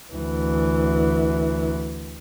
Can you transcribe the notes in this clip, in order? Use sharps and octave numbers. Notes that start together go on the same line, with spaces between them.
D2 E3